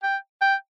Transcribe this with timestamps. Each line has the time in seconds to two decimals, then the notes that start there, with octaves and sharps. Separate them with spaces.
0.03 G5
0.41 G5